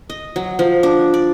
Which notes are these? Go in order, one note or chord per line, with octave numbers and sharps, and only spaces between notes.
D#5
F#3
F3
D4
D5